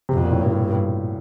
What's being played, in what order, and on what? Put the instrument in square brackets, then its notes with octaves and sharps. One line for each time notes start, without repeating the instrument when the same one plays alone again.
[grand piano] C3
[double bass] F2 [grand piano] B2
[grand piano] A#2
A2
[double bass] G2
[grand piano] A2